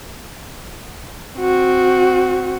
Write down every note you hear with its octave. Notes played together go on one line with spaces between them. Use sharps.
C4 F#4